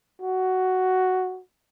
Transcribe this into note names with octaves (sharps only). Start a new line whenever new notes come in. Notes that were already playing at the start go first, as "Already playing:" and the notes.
F#4